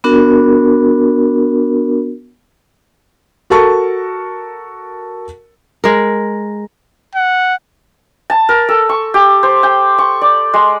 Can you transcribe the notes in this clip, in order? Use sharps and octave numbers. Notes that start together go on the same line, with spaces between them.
B3 D4 F#4 A#4
F#4 A4 A#4 A5 C#6
G#3 A#4
F#5
A5
A#4
A4
C#6
G4
C5
G5
C#6
D5
G#3